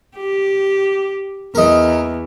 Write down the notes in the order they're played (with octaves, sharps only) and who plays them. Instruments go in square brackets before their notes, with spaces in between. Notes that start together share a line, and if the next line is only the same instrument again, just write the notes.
[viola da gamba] G4
[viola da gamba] E2 [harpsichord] D#4 A#4